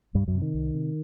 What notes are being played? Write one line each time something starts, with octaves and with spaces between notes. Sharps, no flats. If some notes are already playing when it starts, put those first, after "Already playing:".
C2 G2 G3
F#2 F#3
C3
D#3
C2
C3